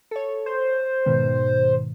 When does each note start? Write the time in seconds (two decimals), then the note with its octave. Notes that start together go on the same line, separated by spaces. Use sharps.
0.11 A4 C#5
0.46 C5
1.06 G#2 B2 D#3